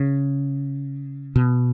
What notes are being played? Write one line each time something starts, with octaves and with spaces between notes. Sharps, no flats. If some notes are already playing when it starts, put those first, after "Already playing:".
Already playing: C#3
B2